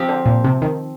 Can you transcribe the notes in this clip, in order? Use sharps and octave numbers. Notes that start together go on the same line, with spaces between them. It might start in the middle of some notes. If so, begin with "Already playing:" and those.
Already playing: F3 C4 G4
D3
A#2
C3
D#3